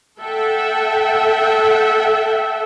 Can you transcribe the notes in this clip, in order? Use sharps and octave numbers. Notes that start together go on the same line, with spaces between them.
A4 E5 F#5 G5